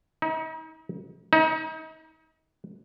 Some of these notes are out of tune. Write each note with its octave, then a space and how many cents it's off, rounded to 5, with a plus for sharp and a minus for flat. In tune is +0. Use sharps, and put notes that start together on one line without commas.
D#4 +40
D#4 +35